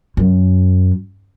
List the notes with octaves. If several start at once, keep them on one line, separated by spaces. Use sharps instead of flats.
F#2